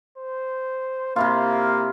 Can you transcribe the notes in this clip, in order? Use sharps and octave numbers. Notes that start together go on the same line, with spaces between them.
C5
C3 A#3 E4 F4